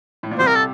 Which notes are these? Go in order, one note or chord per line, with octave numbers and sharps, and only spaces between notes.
A2
A#2
C2 C3 C5
A#4
A4